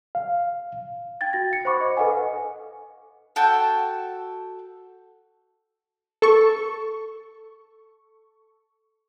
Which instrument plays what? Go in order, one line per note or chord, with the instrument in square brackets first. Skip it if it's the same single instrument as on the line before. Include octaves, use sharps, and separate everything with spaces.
[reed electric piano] F5
[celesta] G5 G#6 A6
F#4 G5 A#6
F5 C#7
C5 F#5 B5 C#6 D6
D#5
A4 B4 D#5 F5 F#5 G#5
[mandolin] F#4 A4 G5 A5
[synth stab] A4 C#6